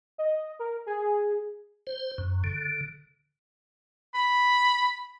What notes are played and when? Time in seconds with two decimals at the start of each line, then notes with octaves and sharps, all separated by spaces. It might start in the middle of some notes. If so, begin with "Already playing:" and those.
0.18 D#5
0.59 A#4
0.86 G#4
1.87 C5
2.18 F#2
2.44 D3
4.15 B5